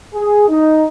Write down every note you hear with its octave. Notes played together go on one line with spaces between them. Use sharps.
G#4
D#4